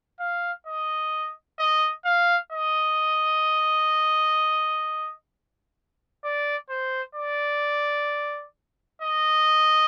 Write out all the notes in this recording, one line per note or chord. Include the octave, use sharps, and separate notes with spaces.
F5
D#5
D#5
F5
D#5
D5
C5
D5
D#5